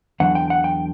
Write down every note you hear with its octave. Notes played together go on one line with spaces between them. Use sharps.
E2 D3 F#3 F#5
G5
F#5
G5